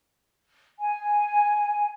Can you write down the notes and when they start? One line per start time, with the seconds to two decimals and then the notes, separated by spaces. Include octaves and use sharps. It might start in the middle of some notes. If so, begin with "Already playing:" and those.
0.80 G#5